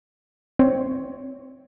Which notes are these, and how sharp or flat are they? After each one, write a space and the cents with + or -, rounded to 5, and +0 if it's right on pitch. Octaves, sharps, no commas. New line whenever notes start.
C4 +5 C#5 +20